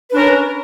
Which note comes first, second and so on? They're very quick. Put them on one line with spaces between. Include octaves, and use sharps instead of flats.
B4 D4 C#4 A#4